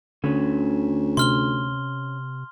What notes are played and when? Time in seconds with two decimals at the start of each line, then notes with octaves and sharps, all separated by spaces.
0.24 D2 D3 C#4 B4 C5
1.17 C3 C6 F6 G7